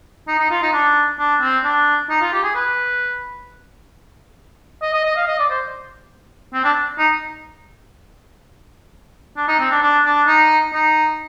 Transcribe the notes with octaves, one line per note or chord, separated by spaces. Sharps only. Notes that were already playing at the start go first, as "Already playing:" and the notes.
D#4
D#4
F4
D#4
D4
D4
C4
D4
D#4
F4
G4
G#4
B4
D#5
D#5
D#5
F5
D#5
D5
C5
C4
D4
D#4
D4
D#4
C4
D4
D4
D4
D#4
D#4